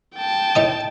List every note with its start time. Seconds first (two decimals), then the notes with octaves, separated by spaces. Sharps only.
0.16 G5 A5
0.55 A2 D#4 D#6